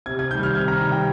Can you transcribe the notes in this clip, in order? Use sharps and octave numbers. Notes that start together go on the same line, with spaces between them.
C3 G#6
G#6
D#3 G3 G6
F6
C3 G#6
A#5
D#3 G3
G5